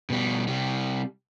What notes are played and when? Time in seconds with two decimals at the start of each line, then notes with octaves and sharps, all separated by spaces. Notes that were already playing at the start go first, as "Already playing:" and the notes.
0.10 B2 G3
0.48 C3 G3